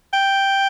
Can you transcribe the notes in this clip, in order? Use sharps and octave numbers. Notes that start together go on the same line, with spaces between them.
G5